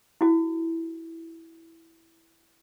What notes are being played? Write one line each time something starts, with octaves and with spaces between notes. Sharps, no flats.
E4 F#4